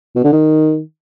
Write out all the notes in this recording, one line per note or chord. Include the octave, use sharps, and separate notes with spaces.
B2
D3
D#3